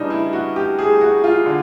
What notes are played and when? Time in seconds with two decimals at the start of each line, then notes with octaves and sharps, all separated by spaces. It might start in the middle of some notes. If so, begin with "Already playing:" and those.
Already playing: C#3 E3 G3 D4 D#4
0.10 E4
0.33 F#4
0.56 G4
0.79 G#4
1.01 F#4
1.24 F4
1.46 D3